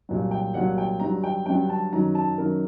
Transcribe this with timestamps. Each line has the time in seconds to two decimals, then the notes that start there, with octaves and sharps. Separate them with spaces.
0.09 C2 A#2 F#3
0.31 G5
0.54 C2 A#2 F#3 F#5
0.78 G5
1.00 G2 D3 F#3 A#5
1.24 G5
1.46 G2 D3 F#3 G5
1.69 A5
1.93 F#2 D#3 F#3 A#5
2.15 A5
2.38 F#2 D#3 F#3 A#4